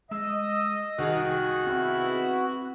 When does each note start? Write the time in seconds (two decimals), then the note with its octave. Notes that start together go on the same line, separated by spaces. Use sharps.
0.11 G#3 D#5 E6
0.98 C2 D#3 F#4 G#4 F#6
1.67 B3 C4 E4